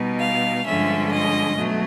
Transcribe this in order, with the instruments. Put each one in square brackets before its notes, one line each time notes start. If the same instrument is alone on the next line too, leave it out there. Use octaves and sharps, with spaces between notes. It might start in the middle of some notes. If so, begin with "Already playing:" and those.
Already playing: [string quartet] B2 G3 B3 D#4
F5
G2 D3 F3 G#3 C#4 E5
D#5
B2 F#3 A3